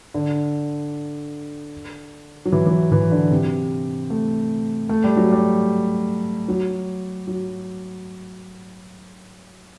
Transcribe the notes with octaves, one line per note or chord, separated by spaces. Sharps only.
D3
F#3
E3
E3
F#3
E3
D3
C3
A3
A3
G3
F#3
G3
F#3
F#3